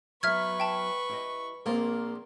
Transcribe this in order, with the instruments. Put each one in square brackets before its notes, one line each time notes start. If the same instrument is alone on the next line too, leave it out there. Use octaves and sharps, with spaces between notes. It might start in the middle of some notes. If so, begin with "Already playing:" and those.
[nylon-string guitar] F#3 B3 [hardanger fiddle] B4 C#6 [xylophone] E5 F6 G#6
[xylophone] E5 G5 A5
[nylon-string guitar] E4 G4 D#5
[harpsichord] A#1 F4 [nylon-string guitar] A#3 C4